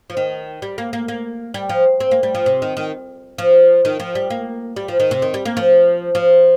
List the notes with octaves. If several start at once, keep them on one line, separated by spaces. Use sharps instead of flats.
F3
D#3
G3
A#3
A#3
A#3
G3
F3
C4
A#3
G3
F3
C3
D#3
D#3
F3
D#3
F3
G3
A#3
G3
F3
D#3
C3
D#3
G3
A#3
F3
F3